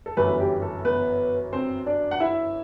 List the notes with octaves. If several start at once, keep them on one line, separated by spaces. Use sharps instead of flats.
A4
G1 F#2 E3 B3 B4
G4
A4
B3 B4
C4 C5
D4 D5
F#5
E4 E5